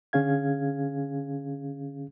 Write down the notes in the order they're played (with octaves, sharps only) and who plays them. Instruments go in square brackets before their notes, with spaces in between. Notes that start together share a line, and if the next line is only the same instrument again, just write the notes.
[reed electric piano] D3 C#4 G#4 F5 G#6